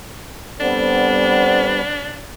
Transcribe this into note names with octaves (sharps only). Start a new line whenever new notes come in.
G3 B3 C4 D4 A4 C5